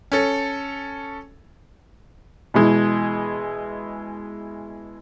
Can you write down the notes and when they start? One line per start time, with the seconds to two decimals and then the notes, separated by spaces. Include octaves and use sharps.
0.12 C#4 A4
2.54 B2 E3 G#3